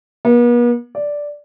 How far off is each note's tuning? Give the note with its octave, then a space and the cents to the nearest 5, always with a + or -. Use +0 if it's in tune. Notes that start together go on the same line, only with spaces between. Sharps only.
B3 -45
D5 -5